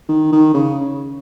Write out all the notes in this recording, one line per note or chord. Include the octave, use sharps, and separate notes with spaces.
D#3
D#3
C#3